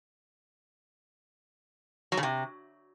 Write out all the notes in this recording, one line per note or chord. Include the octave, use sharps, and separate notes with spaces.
F#3
C#3
C3